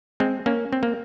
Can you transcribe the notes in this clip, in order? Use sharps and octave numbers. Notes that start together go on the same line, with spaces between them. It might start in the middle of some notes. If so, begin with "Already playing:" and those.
G#3 C4
A#3 C#4
C4
A#3